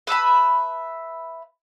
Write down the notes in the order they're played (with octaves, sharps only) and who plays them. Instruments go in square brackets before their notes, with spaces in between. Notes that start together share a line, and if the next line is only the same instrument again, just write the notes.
[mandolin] B4 E5 A5 B5